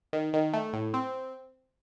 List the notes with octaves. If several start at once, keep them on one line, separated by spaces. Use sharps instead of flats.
D#3
D#3
A3
A2
C4